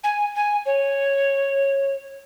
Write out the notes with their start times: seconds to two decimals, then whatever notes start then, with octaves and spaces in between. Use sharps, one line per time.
0.04 G#5
0.35 G#5
0.66 C#5